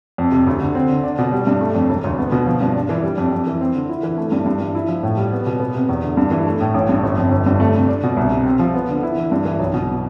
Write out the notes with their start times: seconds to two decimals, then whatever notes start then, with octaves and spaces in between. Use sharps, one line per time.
0.18 F2
0.32 C3
0.47 D2
0.61 D3
0.75 C4
0.89 D3
1.04 D4
1.18 B2
1.32 G3
1.47 G2
1.61 A3
1.75 F2
1.89 E1
2.04 D2
2.18 B3
2.32 B2
2.46 F3
2.61 G2
2.75 D4
2.89 E3
3.03 G3
3.18 F2
3.32 F2
3.47 E3
3.61 C4
3.75 D3
3.89 E4
4.03 E3
4.18 A3
4.32 G2
4.46 G2
4.60 E3
4.75 E4
4.88 F3
5.03 A2
5.17 G3
5.32 B3
5.46 B2
5.60 B3
5.75 C3
5.89 E2
6.03 D3
6.17 G2
6.31 E3
6.46 A3
6.60 A2
6.74 A1
6.89 G2
7.03 G1
7.18 F2
7.31 G1
7.46 G2
7.60 A3
7.74 C3
7.89 D4
8.03 B2
8.17 C2
8.32 C3
8.45 C4
8.59 F3
8.74 B3
8.89 D3
9.03 E4
9.17 E3
9.31 G2
9.45 E3
9.60 B1
9.74 B2